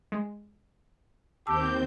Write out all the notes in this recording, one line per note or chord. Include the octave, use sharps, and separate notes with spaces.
G#3
D#2 C4 G4 A5 D6 E6 G6